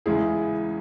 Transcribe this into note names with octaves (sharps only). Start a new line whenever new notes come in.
E2 C#3 G#3 C#4 E4 G#4